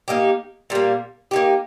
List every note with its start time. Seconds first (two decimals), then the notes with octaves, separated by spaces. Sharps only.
0.08 A#3 D#4 G4
0.70 A#2 G3 A#3
1.31 A#3 D#4 G4